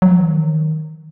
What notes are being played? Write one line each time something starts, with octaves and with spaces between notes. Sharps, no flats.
F#3
F3
E3
D#3